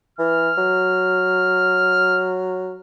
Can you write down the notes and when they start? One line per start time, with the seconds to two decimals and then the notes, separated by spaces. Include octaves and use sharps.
0.19 E3 F6
0.58 F#3